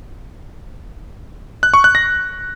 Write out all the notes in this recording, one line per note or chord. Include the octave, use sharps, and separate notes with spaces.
F#6
C#6
F#6
A#6